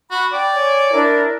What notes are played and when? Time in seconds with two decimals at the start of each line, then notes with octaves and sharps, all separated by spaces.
0.10 F#4 B5
0.32 D5 G5
0.54 C#5 G#5
0.93 D4 E4 A#4